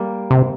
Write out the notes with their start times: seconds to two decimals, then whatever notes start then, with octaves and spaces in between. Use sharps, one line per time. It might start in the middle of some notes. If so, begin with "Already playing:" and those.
Already playing: G3 A#3
0.31 C3